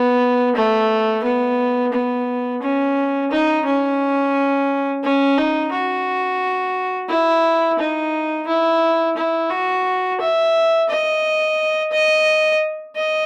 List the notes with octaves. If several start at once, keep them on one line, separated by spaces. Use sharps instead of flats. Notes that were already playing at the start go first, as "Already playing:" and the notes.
Already playing: B3
A3
B3
B3
C#4
D#4
C#4
C#4
D#4
F#4
E4
D#4
E4
E4
F#4
E5
D#5
D#5
D#5